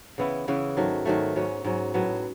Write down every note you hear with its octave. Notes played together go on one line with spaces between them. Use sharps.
C#3 E3 B3 E4
C#3 E3 B3 E4
G#2 D#3 F#3 A3
G#2 D#3 F#3 A3
G#2 F#3 C#4
G#2 F#3 C#4
A2 F#3 B3